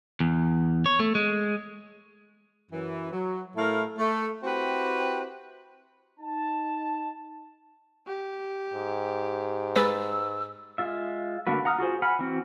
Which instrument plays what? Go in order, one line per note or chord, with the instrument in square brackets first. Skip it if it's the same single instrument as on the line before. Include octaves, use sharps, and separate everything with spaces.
[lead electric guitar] E2
C#5
A3
G#3
[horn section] F#2 E3
F#3
A2 A3 E4 A#4 F5
A3
C4 E4 F#4 G4 B4
[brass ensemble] D#4 A5
[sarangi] G4
[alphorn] G#2
[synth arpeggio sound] G#3 B4 A6 [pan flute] E6
[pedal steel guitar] G#3 F4 E5
D3 A3 A#3 F#4 B4
F#5 A#5 D#6 F6
F4 F#4 G#4 C5
F#5 G#5 B5 F6
E3 C4 F#4